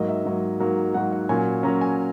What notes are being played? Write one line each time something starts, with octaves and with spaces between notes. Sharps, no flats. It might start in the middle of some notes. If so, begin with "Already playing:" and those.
Already playing: G#2 F#3 A#3 D#5
E5
G#2 F#3 A#3
G#2 F#3 A#3
G#2 F#3 A#3 F#5
F#5
A#2 F#3 C#4 G#5
A#2 F#3 C#4 A#5
G#5